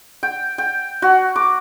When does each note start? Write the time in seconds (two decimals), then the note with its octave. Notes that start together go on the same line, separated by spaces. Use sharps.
0.23 G5
0.58 G5
1.02 F#4
1.36 D6